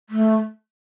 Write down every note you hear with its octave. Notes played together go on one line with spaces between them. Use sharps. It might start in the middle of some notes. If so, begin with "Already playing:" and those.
A3